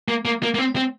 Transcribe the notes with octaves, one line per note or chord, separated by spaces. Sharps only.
A#3
A#3
A#3
A#3
C4
C4